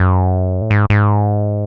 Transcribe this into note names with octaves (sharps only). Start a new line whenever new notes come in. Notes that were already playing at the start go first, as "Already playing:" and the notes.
Already playing: F#2
A2
G#2
G#2